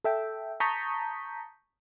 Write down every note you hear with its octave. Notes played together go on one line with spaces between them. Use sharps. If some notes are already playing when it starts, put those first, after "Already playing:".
A4 E5 G5
A5 A#5 C#6 D#6 G6 B6